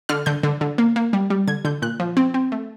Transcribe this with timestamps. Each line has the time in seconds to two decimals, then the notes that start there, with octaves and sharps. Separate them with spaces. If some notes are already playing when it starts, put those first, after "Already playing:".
0.09 D3 F6
0.26 D3 G6
0.43 D3
0.61 D3
0.78 A#3
0.96 A#3
1.13 G3
1.30 G3
1.47 D3 G#6
1.65 D3 G6
1.82 A#2 F#6
2.00 F3
2.17 C4
2.34 C4
2.52 A3